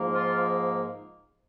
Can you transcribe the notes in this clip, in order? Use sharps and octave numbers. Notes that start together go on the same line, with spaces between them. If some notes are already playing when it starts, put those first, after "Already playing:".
Already playing: G#2 F3 A#3
F4